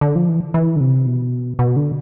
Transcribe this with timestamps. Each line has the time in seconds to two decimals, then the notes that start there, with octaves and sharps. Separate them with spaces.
0.01 D3
0.16 F3
0.29 E3
0.54 E3
0.76 D3
0.80 C3
1.06 B2
1.59 B2
1.76 D3